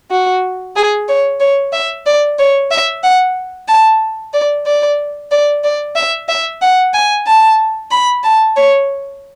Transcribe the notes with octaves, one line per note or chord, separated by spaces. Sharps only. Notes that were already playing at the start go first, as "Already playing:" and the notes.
F#4
G#4
C#5
C#5
E5
D5
C#5
E5
F#5
A5
D5
D5
D5
D5
E5
E5
F#5
G#5
A5
B5
A5
C#5